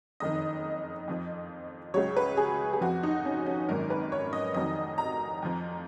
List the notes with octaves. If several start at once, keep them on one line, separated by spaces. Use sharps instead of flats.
F#1 F2 D#3 D#5
F2 F3
C#2 C#3 F#3 C#5
B4
G#4
G#4
F2 F3 F#4
D#4
C#4
C#4
G#1 F#2 D#3 A#4
B4
C#5
D#5
F1 F2 D#3 F#3 D#5
A#5
F2 F3